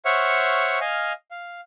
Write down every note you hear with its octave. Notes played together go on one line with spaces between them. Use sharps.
C5 C#5 E5 F#5 C#6 F6
D#5 F5 G#5 F6
F5